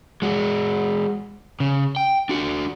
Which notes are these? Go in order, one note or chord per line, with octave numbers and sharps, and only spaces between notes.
G#3 F#4
C#3
G5
D4 F#4